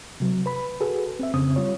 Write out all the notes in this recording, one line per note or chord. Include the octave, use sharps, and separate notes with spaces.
C3 F#3
B4 B5
F#4 G#4 A4 B4
C4 E5
F2 C#3 C4 D#6
G3 F4 C#5